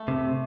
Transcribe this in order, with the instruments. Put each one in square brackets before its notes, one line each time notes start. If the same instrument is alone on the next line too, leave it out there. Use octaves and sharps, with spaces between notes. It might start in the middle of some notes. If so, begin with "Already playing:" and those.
Already playing: [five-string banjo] A3
[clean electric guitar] C3